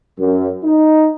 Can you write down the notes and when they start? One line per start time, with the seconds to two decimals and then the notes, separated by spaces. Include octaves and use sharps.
0.19 F#2
0.64 D#4